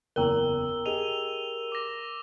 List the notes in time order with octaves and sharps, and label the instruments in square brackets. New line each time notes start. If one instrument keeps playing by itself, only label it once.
[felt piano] F#1 E2 [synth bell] A#4 G5 A#5 [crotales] E6 G7
[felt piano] G4 G#4 D#5 [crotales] D#7 F7 G7
[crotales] D6 A#6